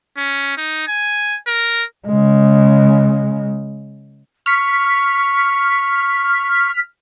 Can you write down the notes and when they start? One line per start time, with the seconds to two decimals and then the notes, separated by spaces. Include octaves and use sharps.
0.17 C#4
0.57 D#4
0.87 G#5
1.47 A#4
2.07 C#3 G#3
4.46 C#6 F6 B6